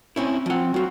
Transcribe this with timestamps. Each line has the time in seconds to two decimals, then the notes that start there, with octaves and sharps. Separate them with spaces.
0.16 C4 C#4 E4
0.46 F3 C4 F#5
0.74 F#3 F4 F#4